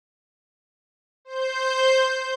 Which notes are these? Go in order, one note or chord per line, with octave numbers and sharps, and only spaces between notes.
C5 G6